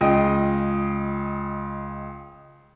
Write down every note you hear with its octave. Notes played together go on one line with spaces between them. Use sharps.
C#2 F4 G#4 D#5 G5 D#6